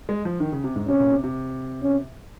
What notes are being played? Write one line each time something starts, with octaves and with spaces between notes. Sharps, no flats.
G#3
F3
D#3
C#3
C3
G#2
C3 C#4
A#2
C3
C3
C#4